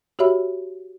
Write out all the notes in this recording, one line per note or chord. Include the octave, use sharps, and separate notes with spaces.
F#4 G4 C#5 E5 B5 E6